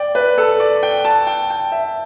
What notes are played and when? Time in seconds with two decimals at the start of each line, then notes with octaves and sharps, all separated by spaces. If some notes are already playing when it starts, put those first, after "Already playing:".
Already playing: D5 G5
0.15 B4
0.38 A4
0.60 D5
0.83 G5
1.05 A5
1.27 G5
1.50 G5
1.72 E5